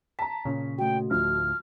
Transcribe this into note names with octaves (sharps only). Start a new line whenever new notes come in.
A5 A#5 B6
A#2 C#3 C#4
A3 F#4 G5
D2 A2 F3 F6